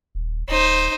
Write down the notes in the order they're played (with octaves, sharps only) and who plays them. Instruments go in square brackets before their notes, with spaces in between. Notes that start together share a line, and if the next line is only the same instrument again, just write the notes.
[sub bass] D#1
[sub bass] D1 [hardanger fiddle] D#4 C5